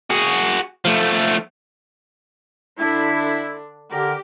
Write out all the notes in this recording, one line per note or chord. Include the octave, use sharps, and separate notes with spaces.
F#4 G#4
F3 A3
D3 D4 E4
D3 G4 A#4